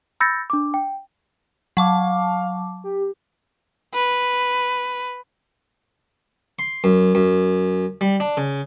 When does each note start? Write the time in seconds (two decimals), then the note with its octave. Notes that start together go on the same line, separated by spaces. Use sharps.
0.20 B5 E6 G6 A6 A#6 C#7
0.50 D4 D6
0.74 G5
1.77 F#3 F5 A5 D6
2.84 G4
3.94 B4
6.59 C6
6.84 F#2
7.15 F#2
8.01 G3
8.20 D4
8.37 C#3